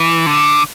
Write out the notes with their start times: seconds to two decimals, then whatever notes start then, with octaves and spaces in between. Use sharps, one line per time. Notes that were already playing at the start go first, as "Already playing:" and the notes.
Already playing: E3
0.26 D3